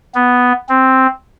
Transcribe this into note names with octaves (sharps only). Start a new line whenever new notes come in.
B3
C4